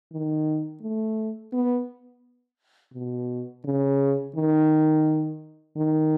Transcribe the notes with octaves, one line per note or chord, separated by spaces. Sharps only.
D#3
A3
B3
B2
C#3
D#3
D#3